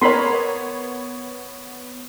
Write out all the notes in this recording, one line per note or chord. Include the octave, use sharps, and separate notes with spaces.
B3 A#4 C#5 B5 C6